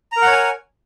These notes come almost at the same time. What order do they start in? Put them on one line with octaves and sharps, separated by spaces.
A#5 A#4 F#5 C#5 G#5